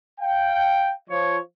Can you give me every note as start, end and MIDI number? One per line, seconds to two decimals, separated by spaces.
0.21 0.93 77
0.21 0.93 79
1.10 1.38 53
1.10 1.38 73